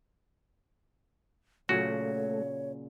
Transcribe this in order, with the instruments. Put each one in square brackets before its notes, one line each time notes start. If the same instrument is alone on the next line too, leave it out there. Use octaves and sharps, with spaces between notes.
[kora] A#2 C#3 F#3 [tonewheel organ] A3 [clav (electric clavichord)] F#4 [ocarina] C#5